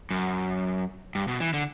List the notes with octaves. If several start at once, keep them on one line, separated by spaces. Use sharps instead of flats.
F#2
G2
B2
E3
D3